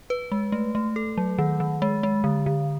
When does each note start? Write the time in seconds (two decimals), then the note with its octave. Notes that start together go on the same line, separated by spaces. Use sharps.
0.10 B4
0.32 G#3
0.52 A3
0.75 A3
0.96 A4
1.18 F#3
1.38 D#3
1.60 D#3
1.82 G#3
2.03 G#3
2.24 D3
2.46 D3